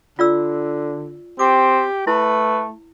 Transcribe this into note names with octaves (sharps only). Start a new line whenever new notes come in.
D3 F4 D5 E6
C4 G4 D6
A3 E4 B4